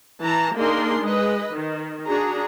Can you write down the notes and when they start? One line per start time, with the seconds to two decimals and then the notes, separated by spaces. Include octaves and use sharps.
0.23 E3 A5 A#5
0.55 A#3 D4 D#4 G#4 A#4 C6
1.02 G#3 B4 D#5
1.54 D#3
2.07 D4 F#4 G#4 A#5